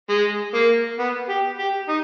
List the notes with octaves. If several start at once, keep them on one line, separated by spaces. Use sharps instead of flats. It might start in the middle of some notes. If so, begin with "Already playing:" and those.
G#3
A#3
B3
G4
G4
D#4